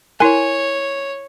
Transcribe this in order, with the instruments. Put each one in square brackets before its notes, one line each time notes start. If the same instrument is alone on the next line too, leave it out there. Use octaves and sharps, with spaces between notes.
[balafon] E4 A#4 [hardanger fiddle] C#5 [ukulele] G#5